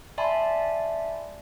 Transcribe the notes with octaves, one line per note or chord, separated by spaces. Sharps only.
D5 E5 G#5 A5 B5 C6